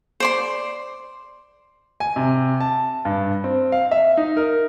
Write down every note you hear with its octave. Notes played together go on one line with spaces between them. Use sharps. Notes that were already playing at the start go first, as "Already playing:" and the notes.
C5 D5 C6
G#5
C3
A5
G2
C4
F5
E5
D#4
A#4